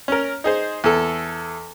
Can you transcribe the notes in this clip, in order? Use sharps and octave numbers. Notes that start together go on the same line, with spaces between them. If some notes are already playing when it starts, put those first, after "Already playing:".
C#4 A#4
D#4 G#4 C5
E2 A4